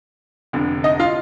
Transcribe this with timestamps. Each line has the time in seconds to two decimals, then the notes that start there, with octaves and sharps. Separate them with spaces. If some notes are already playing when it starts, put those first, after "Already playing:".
0.53 F1 F2 D3
0.84 D#4 D#5
1.00 F4 F5